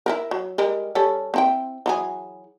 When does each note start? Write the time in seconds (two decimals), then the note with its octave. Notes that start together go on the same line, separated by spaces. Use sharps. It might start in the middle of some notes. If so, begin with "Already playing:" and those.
0.06 E4 F4 A#4
0.31 F#3
0.58 G3 G#3 A#4
0.95 G3 C#4 A4
1.34 C4 E4 G5
1.86 E3 F#3 G#4